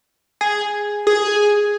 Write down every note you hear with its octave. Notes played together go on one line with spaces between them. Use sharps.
G#4
G#4